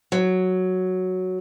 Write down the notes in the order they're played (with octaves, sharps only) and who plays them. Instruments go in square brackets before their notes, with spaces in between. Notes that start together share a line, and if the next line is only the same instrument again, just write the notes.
[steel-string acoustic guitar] F#3